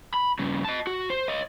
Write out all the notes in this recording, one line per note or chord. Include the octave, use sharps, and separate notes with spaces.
B5
G2 C#3
D#5 A5
F#4
C5
C#5 D#5